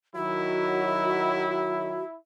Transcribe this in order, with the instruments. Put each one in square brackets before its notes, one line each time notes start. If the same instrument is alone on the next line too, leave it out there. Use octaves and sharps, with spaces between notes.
[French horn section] D#3 F#3 [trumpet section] E4 [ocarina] F#4